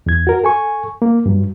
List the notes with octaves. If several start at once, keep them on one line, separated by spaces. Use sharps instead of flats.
E2 G#6
F#4 A#4
A4 G#5 C#6
A#3
G2 F#3